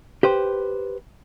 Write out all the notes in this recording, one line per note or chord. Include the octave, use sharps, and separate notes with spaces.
G4 B4 C5